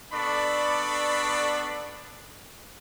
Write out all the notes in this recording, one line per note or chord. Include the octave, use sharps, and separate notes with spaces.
B3 D4 A4 D5 B5 C#6